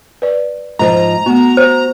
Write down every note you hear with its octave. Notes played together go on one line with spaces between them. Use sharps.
B4 D5
G#2 F3 A#5
A3 B3 F#4
C5